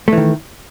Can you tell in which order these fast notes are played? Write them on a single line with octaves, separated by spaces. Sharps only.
A3 E3 D#3